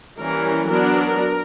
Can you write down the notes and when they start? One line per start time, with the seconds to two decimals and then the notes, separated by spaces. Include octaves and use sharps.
0.18 E3 G3 A#3 C#4 A#4
0.68 F#3 B3 D4 A#4